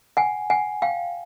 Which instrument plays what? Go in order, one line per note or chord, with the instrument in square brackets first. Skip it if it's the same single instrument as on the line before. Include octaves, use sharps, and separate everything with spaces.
[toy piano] F#5 G#5
F#5 G#5
F5 G5